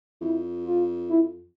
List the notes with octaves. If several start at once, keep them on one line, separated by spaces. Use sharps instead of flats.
F2 E4
F4
E4